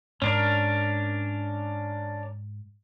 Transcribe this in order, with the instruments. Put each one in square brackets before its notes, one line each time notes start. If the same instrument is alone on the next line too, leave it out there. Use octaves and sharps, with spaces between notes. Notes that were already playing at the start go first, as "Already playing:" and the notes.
[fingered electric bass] G#2 [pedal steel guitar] C#4 D4 A#4